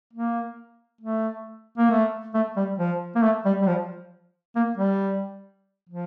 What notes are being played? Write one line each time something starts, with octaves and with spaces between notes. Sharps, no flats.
A#3
A3
A#3
A3
A3
G3
F3
A#3
A3
G3
G3
F3
A#3
G3
F3